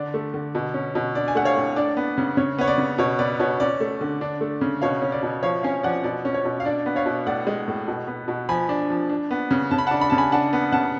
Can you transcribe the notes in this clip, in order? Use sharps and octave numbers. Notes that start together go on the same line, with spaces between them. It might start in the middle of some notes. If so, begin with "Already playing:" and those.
Already playing: D3 D4 D5
A3
D3
B2
C#4
B2
D4 D5
G#5
A3 F#5
C#5 F5
A2
D4 D5
B3
C#3
C#3 C#5
B3 C#5
D5
C#3
B2 C#5
B3 D5
B2 C#5
C#4 D5
A3
D3
D4
A3
C#3
B2 C#5 F5
C#4
D5
B2
F3 C#5 F5
C#4 F5 G#5
F3 D5 F#5
B2 D5
C#4
C#5
B2
F5
D4 D5
B3
C#5 F5
B2
A2 D5 F#5
G#3
A2
B2
B3
B2
F3 G#5 B5
D4
F3
D4
B3
C#3
C#3 A5
B5
D4 F#5 A5
B5
C#3 A5
G#5 B5
D4 F#5 A5
B3
C#3 F#5 A5